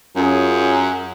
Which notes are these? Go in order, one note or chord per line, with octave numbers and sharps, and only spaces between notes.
F#2 C#4 F4 G#4